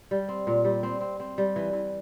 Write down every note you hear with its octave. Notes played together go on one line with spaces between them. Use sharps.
G3
C4
A#2
G3
C4
C4
C4
G3
E3
E3